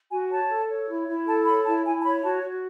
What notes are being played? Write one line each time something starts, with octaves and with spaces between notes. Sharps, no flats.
F#4 G#5
C#5 A5
A4
C#5
E4
E4
A4 A5
C#5 B5
E4 A5
E4 G#5
A5
C#5 B5
F#4 A5
F#4